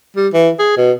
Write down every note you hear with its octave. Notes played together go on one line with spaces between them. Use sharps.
G3
E3
G#4
B2